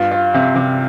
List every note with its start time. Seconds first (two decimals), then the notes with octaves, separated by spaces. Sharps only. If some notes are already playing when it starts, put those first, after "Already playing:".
Already playing: G2 F4
0.11 F4
0.34 C3
0.56 C3